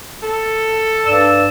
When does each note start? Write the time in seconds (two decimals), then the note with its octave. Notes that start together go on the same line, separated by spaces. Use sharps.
0.23 A4
1.05 G2 D5 E6